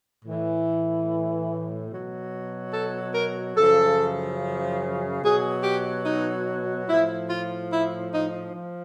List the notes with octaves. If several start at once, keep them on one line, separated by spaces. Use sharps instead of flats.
A2 E3
B2 F#3
A4
A#4
F#2 C#3 F3 A4
B2 F#3 G#4
G4
D#4
A2 F3 E4
F4
E4
D#4
F3